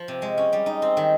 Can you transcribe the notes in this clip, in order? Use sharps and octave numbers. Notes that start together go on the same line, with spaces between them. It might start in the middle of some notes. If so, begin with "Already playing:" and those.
Already playing: F3
C3
G#3
C#4
G3
D#4
C4
D#3